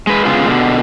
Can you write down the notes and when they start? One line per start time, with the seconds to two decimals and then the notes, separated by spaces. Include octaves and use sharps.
0.07 G#3 B4
0.25 C#3 G#3 B3 F4
0.47 B2 D3